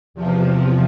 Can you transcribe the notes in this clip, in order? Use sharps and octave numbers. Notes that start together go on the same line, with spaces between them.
E2 C3 F3